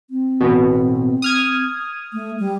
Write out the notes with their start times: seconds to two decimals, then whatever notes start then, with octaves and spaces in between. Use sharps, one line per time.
0.10 C4
0.41 A1 B2
1.22 D#6 F6 G#6
2.13 A3
2.39 G3